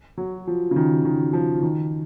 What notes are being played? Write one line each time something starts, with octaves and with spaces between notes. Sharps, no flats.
F#3
F3
C#3
D#3
D#3
F3
D#3